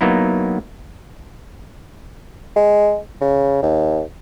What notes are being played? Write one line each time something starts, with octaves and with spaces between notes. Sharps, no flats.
F#3 A#3 B3 D#4 E4
G#3
C#3
D#2